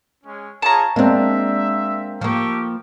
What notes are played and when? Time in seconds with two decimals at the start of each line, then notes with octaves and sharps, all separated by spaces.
0.24 G#3 C#4
0.62 F4 G#4 C#5 A5 A#5
0.96 G#3 A#3 C4 D4 E5
2.21 F3 A#3 G4 A4 C#6